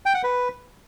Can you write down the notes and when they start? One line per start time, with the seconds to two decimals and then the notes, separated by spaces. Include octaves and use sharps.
0.06 G5
0.15 F#5
0.24 B4